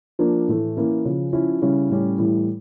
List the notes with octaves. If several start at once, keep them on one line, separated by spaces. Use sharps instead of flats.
F3 A#3 D4
A2 E3 A3
E3 A#3 C#4 E4
C#3 F3 C#4
F3 C#4 E4
C#3 G3 C#4 E4
A2 G3 C#4
A2 E3 G3